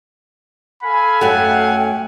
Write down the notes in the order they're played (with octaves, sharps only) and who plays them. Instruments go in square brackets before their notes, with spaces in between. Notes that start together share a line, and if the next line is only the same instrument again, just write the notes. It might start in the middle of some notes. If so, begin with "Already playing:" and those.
[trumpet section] A4 F5 G#5 [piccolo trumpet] B5
[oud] F#2 F#3 A3 [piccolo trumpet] F#5 [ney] G5